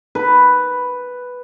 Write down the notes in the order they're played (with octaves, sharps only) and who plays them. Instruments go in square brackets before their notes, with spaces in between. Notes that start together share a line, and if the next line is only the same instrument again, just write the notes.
[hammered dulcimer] B4